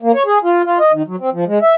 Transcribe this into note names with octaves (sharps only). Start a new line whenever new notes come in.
A#3
C#5
G#4
F4
F4
D#5
D#3
F#3
C4
F3
G#3
E5